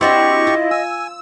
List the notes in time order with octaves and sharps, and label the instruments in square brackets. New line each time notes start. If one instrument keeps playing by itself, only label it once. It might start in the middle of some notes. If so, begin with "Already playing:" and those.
[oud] C4 D4 F#4 [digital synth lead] E4 [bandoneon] G4 C#6 [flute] D#5
[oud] F4
[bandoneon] G#5 [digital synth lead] E6